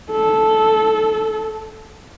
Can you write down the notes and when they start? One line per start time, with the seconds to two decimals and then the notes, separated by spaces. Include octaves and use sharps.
0.12 A4